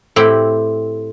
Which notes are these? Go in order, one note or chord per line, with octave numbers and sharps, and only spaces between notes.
A2 C4 E4 G4 G5 B5